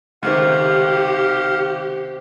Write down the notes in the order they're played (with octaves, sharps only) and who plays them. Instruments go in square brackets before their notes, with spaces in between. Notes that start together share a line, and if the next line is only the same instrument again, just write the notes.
[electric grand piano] C#2 D#3 [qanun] C3 A3 [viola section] G4 [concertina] F5 F#5